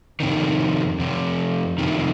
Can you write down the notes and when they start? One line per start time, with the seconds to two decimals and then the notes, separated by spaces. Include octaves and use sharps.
0.20 F2 C3 D#3
0.99 F2 C3
1.78 F2 C3 D#3